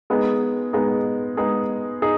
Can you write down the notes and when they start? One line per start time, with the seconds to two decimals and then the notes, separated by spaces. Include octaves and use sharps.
0.10 G#3 B3 D#4 G#4
0.73 G#3 B3 D#4 G#4
1.37 G#3 B3 D#4 G#4
2.02 D#4 G#4